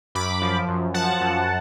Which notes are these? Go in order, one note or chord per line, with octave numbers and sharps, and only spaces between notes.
F#2 B5 D6
F3
F#2
F3 F#5 A5
F#2